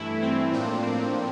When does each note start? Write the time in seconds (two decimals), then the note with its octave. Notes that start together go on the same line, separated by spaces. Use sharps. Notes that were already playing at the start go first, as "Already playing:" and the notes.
Already playing: G2 E3 A3 E4
0.22 C4
0.52 A2 F3 A#3 D4
0.83 C4